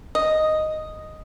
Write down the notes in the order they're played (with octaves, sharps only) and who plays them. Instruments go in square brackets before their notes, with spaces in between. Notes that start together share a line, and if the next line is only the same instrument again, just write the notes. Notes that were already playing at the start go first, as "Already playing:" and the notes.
[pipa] D#5